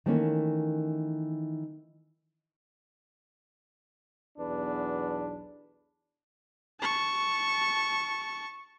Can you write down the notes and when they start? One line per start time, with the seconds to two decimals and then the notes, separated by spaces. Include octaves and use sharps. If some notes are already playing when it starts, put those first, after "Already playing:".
0.06 D#3 E3 A3 A#3 C#4
4.37 B1 E2 D4 B4
6.81 A5 C#6